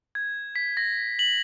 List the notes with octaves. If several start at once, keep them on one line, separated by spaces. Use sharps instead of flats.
G#6
B6
A#6
F#7